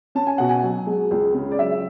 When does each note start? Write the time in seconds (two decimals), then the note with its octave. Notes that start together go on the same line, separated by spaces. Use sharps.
0.15 C#4 A5
0.27 G#5
0.38 B2 F#5
0.49 G#5
0.63 F#3
0.87 G#3
1.11 C#2
1.34 C#3
1.51 D5
1.59 F#3 E5